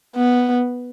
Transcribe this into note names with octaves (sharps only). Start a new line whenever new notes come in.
B3